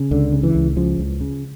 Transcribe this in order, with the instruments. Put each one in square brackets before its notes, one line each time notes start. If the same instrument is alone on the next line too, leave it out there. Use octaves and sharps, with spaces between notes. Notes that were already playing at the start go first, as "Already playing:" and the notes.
Already playing: [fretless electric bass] C#3
C#2 D3
C#3
E3
C#2
C#3 F3
C#2
C#3